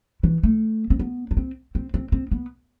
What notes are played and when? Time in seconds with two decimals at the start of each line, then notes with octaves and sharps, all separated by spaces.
0.23 E3
0.43 A3
0.90 C4
0.99 B3
1.31 D4
1.37 C4
1.75 C4
1.94 C4
2.12 C4
2.31 B3